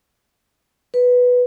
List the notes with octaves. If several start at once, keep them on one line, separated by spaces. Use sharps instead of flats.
B4